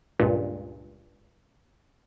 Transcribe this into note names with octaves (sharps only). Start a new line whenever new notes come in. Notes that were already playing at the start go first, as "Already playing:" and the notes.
C#2 G2 A#2